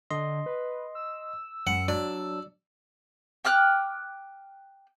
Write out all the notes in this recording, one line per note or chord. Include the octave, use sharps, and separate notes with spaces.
D3 D#5 C6
B4
E6
F#2 F#5
F#3 D4 D5
G5 D6 F6 F#6